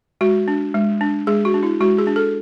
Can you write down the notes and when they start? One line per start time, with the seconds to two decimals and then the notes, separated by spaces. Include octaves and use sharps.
0.21 G#3 F#4
0.48 D4
0.74 G#3
1.01 D4
1.27 G#3 G#4
1.45 F#4
1.54 D4
1.63 E4
1.81 G#3 F#4
1.98 G#4
2.07 D4
2.16 A4